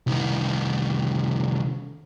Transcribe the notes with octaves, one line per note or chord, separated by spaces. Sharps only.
C2 D#3